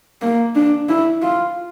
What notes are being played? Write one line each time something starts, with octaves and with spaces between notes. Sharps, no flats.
A#3
D4
E4
F4